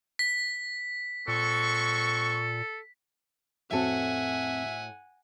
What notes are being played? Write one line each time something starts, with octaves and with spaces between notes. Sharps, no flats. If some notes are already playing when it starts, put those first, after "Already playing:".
B6
A#2 G#3 C4 A4 C#6
F2 A2 C4 F#4 A4 E5 F#5 G#5